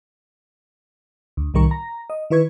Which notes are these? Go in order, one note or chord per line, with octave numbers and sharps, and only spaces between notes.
D2
C2 A2 D#3 G3 A#4 C#6
A#5
D#5
D#3 E4 B4 C#6 G#6